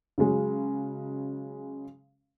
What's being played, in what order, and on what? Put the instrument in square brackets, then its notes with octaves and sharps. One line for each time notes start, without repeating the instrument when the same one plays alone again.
[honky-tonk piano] C#3 F#3 G#3